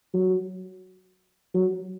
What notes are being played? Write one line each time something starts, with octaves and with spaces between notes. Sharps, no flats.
F#3
F#3